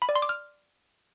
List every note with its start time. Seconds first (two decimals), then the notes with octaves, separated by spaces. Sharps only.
0.02 B5
0.09 D5
0.16 C6
0.22 D6
0.29 F6